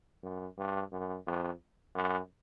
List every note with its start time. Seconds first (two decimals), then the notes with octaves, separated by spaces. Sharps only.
0.23 F#2
0.58 G2
0.92 F#2
1.27 F2
1.95 F#2